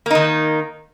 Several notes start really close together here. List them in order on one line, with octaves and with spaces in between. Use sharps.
A#3 D#4 D#3